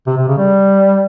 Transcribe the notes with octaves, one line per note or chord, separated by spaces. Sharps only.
C3
C3
C#3
G3